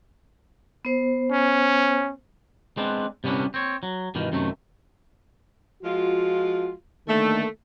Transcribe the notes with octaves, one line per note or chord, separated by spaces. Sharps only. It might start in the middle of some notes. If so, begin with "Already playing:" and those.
B3 C5
C#4
G#3 B3 C4 D4
C3 G3 B3 C#4 D4
C4 C#5
F#3
G2 B2 D#3 E3
F#2 C3 D#3 A3
F3 G#3 F4 F#4
D3 D#3 A3 A#3